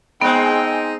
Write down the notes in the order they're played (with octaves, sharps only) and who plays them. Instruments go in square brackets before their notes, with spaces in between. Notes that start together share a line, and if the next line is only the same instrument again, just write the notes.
[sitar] G#3 C4 [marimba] B3 [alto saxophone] D#4 [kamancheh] G5 G#5